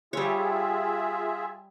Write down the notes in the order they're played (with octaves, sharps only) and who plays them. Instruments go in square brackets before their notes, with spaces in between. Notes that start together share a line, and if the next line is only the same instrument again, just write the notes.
[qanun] G3 C#5 [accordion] F4 G#4 E5